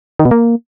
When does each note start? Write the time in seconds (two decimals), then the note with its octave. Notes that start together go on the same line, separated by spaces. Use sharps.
0.19 D#3
0.25 B2
0.31 A#3